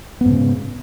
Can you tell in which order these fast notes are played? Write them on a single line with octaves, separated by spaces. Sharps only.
B3 G#2 C#3